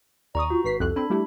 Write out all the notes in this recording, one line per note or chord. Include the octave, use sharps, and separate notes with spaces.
D#2 D5 A#5 C#6 D#6
F4 F#4
G#1 B4 B6 C7
C2 F2 A4 F#6
C4 D4 B5
G3 A3 E4 G4